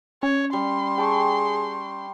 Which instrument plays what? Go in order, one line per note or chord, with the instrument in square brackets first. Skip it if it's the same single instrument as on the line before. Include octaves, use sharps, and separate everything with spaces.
[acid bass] C#4 [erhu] C#5
[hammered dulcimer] G3 [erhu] C6
[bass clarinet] G#4 [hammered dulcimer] G5 A5 C#6